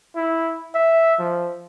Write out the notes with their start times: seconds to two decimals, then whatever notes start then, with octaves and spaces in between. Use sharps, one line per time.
0.16 E4
0.74 E5
1.19 F3